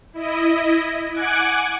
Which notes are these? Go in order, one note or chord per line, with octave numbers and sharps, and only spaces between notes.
E4 D#5
F#5 G#5 D6 F#6 G#6 D7